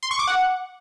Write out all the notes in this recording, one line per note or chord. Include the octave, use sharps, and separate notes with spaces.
C6
C#6
D6
F#5